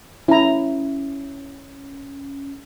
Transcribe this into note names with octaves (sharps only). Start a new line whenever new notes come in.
C#4 E4 A#5